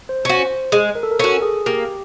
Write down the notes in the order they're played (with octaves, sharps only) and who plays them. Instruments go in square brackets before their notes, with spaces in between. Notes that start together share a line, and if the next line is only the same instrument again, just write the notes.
[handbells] C5
[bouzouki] C#4 F#4
[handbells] C5
[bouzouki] G#3
[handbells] A#4
A4
A#4
[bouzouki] C#4 [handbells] A4
[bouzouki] F#4
[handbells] G#4
[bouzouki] A#3 [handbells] G4